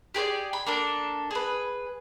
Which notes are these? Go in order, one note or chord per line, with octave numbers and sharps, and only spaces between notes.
G4 G#4 C5 D5
B5
A#3 D4 A4
G#4 B4